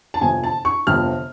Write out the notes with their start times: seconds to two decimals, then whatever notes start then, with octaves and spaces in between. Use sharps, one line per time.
0.14 A5
0.21 G1 F2 C3 G#5
0.44 A5
0.65 C#6
0.87 G1 F2 C3 F6